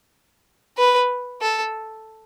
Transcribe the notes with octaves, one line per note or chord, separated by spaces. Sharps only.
B4
A4